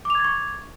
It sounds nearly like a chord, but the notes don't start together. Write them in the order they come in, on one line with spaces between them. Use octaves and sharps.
D6 F7 G#6 A6 C#6